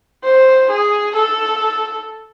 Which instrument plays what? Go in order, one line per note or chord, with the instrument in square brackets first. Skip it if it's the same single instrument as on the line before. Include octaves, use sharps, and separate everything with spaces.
[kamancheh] C5
G#4
A4